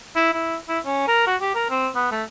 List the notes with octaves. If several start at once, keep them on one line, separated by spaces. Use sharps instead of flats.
E4
E4
E4
C#4
A#4
F#4
G4
A#4
C4
B3
A3